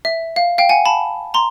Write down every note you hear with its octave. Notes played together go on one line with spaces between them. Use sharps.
E5
F5
F5 G5
F#5 G#5
A5 B5
A#5 C6